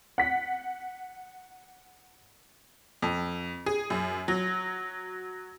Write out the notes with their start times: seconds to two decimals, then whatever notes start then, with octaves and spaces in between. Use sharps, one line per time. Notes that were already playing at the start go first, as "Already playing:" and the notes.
0.18 F#5 B6
3.02 F2
3.66 G#4
3.90 F#2
4.28 F#3